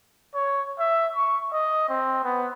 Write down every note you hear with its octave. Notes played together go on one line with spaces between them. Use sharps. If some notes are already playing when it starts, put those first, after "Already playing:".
C#5
E5
C#6
D#5
C4
B3